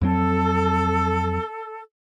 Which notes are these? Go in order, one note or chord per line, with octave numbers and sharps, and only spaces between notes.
F2 F#3 C4 A4